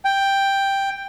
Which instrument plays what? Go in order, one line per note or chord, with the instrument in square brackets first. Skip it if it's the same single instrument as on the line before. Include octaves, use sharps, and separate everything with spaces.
[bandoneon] G5